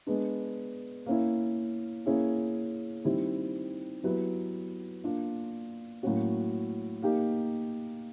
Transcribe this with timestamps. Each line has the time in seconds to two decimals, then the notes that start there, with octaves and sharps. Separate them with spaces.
0.07 G#3 B3 D4
1.06 A#3 C#4 E4
2.06 A#3 C#4 E4 G#4
3.04 D#3 G3 C4 E4
4.04 F#3 B3 E4 G4 B4
5.04 A#3 D4 F4
6.03 A2 F#3 A#3 C#4 F#4
7.02 A#3 D#4 G4